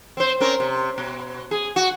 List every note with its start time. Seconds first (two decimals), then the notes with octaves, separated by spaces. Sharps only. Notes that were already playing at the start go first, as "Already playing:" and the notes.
0.17 C4 C5
0.40 C4 C#4 A#4
0.60 C3
0.98 B2
1.51 G#4
1.76 F#4